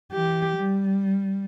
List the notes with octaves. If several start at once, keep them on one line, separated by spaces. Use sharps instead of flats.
E3 G4
G3